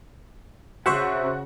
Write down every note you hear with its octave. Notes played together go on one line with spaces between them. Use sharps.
C#3 F#4 C5 E5 F#5 C#6